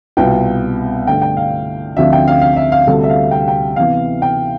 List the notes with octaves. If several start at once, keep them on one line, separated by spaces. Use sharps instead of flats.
C2 B2 B3 F4 G5
G2 D3 A3 G5
G5
F5
D2 D3 F3 C4 F4 E5
G5
F5
F5
E5
F5
D2 C3 G3 A4
E5
F5
G5
F5
G5
C3 E3 B3 F5
G5